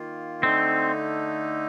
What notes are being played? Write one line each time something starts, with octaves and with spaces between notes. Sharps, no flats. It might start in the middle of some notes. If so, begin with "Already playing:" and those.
Already playing: D#3 A#3 F4
D3 A3 C4 D#4